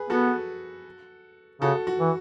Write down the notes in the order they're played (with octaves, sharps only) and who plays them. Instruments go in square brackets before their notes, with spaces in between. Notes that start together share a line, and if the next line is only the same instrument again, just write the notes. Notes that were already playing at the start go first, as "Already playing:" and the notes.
Already playing: [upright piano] G#4 B4
[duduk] B3 [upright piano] F#4 A4
[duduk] C#3 [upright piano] F#4 A4
[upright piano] F#4
[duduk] E3